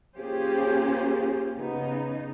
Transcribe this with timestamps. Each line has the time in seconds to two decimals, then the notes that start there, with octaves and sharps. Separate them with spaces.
0.17 A#3 C#4 F4 G4 G#4 C5
1.56 C#3 B3 D#4